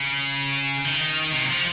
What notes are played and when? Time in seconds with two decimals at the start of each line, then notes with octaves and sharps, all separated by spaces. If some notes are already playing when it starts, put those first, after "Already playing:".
Already playing: C#3
0.86 D#3
1.33 C3
1.43 F#3
1.50 F3